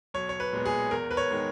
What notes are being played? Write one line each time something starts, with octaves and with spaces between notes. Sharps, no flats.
B1 C#5
C#5
B4
A#2 G#3 B3
G#4
E2 A#4
B4
C#5
D#3 G#3 B3